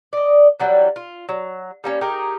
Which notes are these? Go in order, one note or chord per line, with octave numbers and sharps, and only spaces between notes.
D5 D#5
E3 F#3 G3
F4
F#3
G3 A#3 C#4
D#4 G4 G#4 A#4